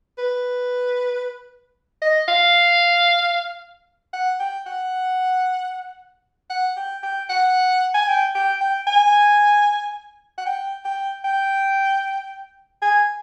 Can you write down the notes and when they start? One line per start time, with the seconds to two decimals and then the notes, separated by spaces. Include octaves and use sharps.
0.18 B4
2.02 D#5
2.28 F5
4.14 F#5
4.40 G5
4.66 F#5
6.50 F#5
6.77 G5
7.03 G5
7.30 F#5
7.94 G#5
8.08 G5
8.35 G5
8.61 G5
8.87 G#5
10.38 F#5
10.46 G5
10.85 G5
11.25 G5
12.82 G#5